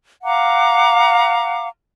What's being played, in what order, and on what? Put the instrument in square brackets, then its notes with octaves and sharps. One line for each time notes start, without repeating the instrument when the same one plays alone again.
[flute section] F5 F#5 A#5 D6